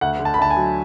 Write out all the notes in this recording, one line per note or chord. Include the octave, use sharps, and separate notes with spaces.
D2 F#5
D3
A5
B5
D2 A5
G#5
F#3